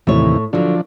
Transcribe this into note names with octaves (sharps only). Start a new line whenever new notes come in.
D#2 A2 C3 E3 C#5
D3 F3 F#3 D4